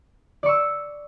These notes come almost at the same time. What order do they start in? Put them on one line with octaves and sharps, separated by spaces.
D5 C#6 E6